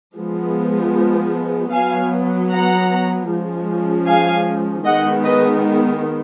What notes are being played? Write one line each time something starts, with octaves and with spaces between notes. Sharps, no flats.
F3 G#3 B3
F#3 B3 F5 G#5
F#5 A#5
F3 G#3 C#4
F5 G#5
D#3 G#3 B3 D#5 F#5
B4 D#5